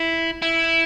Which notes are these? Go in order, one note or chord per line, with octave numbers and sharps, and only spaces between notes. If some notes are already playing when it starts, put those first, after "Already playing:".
Already playing: E4
E4